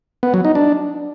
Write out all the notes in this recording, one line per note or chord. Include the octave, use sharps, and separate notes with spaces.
B3
F#3
D#4
D4